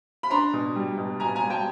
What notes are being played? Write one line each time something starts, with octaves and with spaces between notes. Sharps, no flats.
B5
D4 A#5 C6
B2
G3
B2
B2 G#5 A#5
G#5 A#5
G3
G5 A5